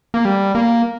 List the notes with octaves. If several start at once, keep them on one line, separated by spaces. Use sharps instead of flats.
A#3
G3
A#3